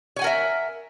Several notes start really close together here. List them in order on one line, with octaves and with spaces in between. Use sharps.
C#5 G#5 F#5 A#4 E5